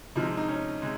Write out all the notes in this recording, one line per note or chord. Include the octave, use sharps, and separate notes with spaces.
C3 F3 G#3 D#4
D#4
C#4
C3 G#3